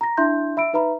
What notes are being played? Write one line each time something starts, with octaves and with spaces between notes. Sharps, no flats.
A#5 A#6
D4 E4 E5 C6 G6
E5 B5 E6 D7
D#4 B4 E5 A#5 B5